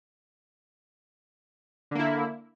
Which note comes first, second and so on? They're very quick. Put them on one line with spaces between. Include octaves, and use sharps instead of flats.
D3 A#3 E4